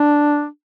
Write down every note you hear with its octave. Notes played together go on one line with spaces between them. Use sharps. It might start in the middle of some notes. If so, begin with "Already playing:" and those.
Already playing: D4